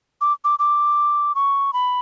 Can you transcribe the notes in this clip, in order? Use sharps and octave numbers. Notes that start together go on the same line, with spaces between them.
D6
D6
D6
C#6
B5